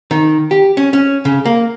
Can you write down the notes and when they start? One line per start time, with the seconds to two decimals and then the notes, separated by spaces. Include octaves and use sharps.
0.11 D#3
0.51 G4
0.77 C#4
0.93 C#4
1.25 C#3
1.45 A#3